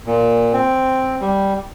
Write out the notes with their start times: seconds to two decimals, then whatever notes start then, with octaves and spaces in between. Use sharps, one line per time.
0.06 A#2
0.53 C4
1.21 G3